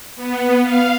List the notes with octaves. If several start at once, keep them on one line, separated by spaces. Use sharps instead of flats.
B3
F5